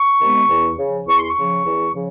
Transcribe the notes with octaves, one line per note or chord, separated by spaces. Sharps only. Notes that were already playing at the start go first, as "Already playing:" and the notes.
Already playing: C#6
C3 D#3 G#3 B3
E2
C#3 F3
E2 C#6
C6
C#6
C#3 F3
E2
C#3 F3